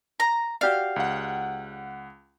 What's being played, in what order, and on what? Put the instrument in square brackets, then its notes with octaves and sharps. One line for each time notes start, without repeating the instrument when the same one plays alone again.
[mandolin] A#5
[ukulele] F#4 G4 D5 [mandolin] F5
[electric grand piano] C#2 F#5